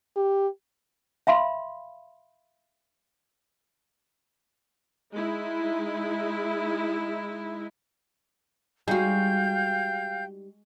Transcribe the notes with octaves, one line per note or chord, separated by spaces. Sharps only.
G4
E5 F5 B5 C6
G#3 D#4 E4
G3 G#3 D#4 F#4 F5 G5 G6